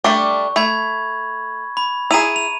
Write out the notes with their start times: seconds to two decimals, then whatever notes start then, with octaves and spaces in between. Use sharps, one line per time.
0.04 G3 A3 D4 C#6
0.56 A3 B5 G#6
1.77 B5
2.11 E4 G#4 A#5 D#7 F7
2.36 F7